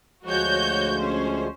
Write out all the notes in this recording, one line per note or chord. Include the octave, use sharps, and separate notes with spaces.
D2 F3 G#3 F#4 C#5 G6
C#4 C5